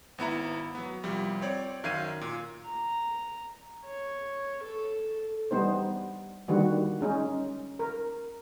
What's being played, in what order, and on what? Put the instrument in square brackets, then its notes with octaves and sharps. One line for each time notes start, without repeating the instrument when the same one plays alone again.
[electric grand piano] G#1 B3 E4 A#5
F#3 B3
C2 F3 G3
C4 C#5 D5
F#2 D#3 F5 G#6 C7 D#7
A#2
[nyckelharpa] A#5
C#5
A4
[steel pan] G3 B3 D#4 C5
D3 D#3 G3 A#3 F#4
G#3 C#4 D#4
A#4